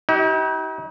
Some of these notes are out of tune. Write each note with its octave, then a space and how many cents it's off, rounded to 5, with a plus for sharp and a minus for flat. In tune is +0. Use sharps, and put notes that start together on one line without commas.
D#4 +45 G4 -40